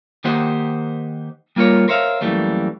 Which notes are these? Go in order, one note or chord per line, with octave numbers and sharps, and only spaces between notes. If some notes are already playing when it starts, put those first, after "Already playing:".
D#3 A#3 D#4 G4 C5 F#5
G3 A#3 F4 A#4 C#5
A#4 C5 C#5 E5 F5
F#2 E3 G3 A3 A#3